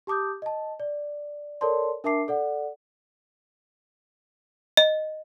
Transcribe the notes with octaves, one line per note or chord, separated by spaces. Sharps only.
G4 A5 D6 D#6 G6
D#5 A5
D5
A4 A#4 C#5 D5 A5 C6
D4 A#4 E5 A5 D6 C7
A4 D5 F#5
D#5